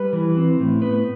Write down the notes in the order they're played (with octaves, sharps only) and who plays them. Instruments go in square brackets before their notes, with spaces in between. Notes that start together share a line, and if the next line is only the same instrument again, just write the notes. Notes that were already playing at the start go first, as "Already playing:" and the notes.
Already playing: [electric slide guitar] G3 B4
E3
C4
A2
B3 B4